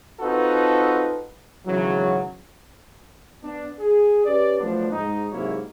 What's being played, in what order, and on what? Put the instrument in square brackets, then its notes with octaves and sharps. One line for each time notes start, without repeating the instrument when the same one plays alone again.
[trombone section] C4 D#4 F4 F#4 A4 B4
G#1 C#3 E3 F#3
[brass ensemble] B3 D4
G#4
C#4 G4 B4 D5
F3 F#3 A3 B3 D4
G#2 D#4
G#2 C3 F#3 A#3 E4 C#5